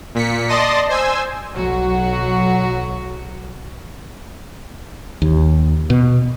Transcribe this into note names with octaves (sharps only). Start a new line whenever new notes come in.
A#2 B6 C#7
D5 D#5 A5 C6 D#6 A#6
C5 G#5 E6
B1 F#3 F#4
D#2
B2